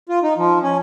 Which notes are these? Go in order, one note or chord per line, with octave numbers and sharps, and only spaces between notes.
F4
D#4
F3
C#4